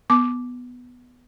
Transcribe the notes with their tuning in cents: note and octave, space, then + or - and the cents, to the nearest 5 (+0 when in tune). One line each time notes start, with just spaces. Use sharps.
B3 +0 D6 +0